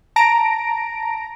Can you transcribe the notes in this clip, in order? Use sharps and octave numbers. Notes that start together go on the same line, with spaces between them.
A5 A#5 A#6 D7